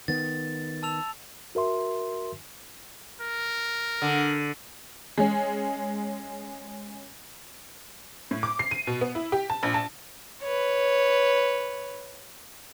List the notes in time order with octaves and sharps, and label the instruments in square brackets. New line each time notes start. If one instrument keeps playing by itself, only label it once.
[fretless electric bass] D#3 B3 [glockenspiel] A6
[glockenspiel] A5 E6 F7
[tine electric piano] F#4 A#4 E5 C6
[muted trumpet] A#4
[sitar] D3
[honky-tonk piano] G#3 C#4
A2
D6
C7
D#7
B2
B3
E4
G4
A5
A#1
A5
[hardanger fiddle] B4 C#5